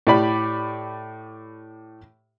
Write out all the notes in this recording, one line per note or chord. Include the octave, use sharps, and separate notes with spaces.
A2 G4 D5 B5